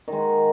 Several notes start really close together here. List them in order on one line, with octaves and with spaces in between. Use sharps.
D#3 G#3 F#4